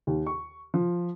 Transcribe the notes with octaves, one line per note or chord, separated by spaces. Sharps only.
D#2
C#6
F3